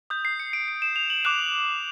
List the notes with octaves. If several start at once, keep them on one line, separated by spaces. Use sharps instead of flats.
D#6 G6
C7
C#7
D7
D7
E7
F7
F#7
D6 F#6 E7